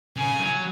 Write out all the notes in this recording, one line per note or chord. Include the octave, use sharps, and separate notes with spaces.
C#3 G#5
F#3